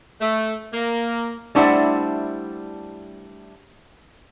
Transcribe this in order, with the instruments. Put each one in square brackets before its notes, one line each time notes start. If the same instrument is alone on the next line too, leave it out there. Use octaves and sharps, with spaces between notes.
[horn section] A3
A#3
[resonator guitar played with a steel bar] G3 A3 D4 E4 C5 F#5